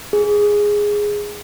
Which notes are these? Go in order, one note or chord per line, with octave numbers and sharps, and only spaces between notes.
G#4